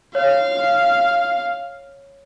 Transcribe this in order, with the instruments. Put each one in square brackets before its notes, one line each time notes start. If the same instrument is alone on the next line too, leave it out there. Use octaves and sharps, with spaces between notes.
[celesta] C#5 [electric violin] F5